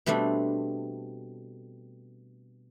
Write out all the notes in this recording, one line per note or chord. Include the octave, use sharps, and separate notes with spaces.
B2 G3 A3 C4 D4